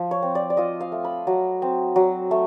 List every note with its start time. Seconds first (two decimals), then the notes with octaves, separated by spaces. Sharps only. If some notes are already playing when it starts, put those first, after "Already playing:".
Already playing: F3
0.11 C#5
0.22 C4
0.35 D5
0.50 D5
0.57 F4 D#5
0.81 F5
0.92 A3
1.04 B5
1.27 F#3
1.62 C4
1.96 F#3
2.31 A3